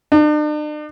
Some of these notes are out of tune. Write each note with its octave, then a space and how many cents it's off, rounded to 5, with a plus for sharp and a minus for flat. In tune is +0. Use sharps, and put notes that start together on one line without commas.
D4 +45